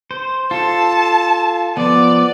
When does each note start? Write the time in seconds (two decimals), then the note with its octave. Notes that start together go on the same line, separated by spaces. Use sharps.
0.11 C5
0.51 F4 A4 A5
1.77 F3 B3 D5